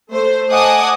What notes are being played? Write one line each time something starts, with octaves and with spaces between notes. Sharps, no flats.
A3 C5
D#5 F#5 G#5 A5 D6 D#6